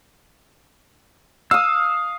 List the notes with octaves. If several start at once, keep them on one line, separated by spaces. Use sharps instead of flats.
F5 D#6 E6